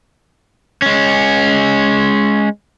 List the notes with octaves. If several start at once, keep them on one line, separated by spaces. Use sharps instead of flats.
G#3 C#4